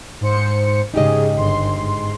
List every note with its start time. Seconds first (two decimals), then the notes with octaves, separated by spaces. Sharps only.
0.21 G#2 C5 C#7
0.94 G#2 C#3 D#4 G4 G#4 D#5
1.37 G1 C6
1.77 G#2